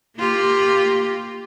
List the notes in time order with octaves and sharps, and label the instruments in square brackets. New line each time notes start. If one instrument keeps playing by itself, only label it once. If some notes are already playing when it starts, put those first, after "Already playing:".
[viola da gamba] A#3 F4 G4